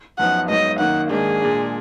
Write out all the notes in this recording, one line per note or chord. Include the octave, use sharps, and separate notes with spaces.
F#2 F3 B3 D#4 F#5
G#2 F#3 B3 D#4 D#5
F#2 D#3 A#3 D#4 F#5
G#2 D#3 A#3 D4 G#4
A#2 G#3 D4